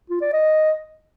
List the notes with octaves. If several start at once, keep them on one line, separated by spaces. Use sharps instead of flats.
F4
D5
D#5